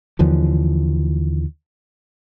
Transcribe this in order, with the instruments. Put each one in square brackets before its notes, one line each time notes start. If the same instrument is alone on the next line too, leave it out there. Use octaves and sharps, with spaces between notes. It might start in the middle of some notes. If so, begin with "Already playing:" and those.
[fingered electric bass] D#2 D3 E3 F3